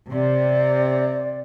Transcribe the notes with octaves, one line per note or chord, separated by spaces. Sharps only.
C3 D5